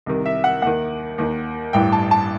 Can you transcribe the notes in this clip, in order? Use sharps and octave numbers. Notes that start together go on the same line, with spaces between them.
C2 C3 D#3
E5
F#5
D#2 D#3 F#5
D#2 D#3
A1 G2 E3 G5
A5
A5